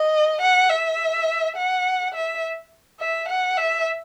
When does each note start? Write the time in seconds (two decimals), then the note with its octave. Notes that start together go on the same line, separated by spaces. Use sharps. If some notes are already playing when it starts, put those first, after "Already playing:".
Already playing: D#5
0.41 F#5
0.70 E5
1.56 F#5
2.14 E5
3.00 E5
3.28 F#5
3.58 E5